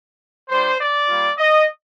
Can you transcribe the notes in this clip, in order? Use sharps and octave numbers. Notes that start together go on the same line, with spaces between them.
G3 D4 F4 C5
D5
G3 A#3 F4
D#5